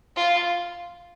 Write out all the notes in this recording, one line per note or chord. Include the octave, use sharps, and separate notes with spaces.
F4